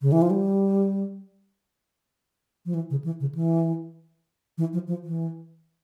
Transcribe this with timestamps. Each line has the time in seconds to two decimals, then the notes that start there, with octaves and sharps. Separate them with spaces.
0.02 C#3
0.12 E3
0.22 F3
0.30 G3
2.66 F3
2.74 E3
2.90 C#3
3.04 E3
3.20 C#3
3.35 E3
4.58 E3
4.73 F3
4.88 F3
5.04 E3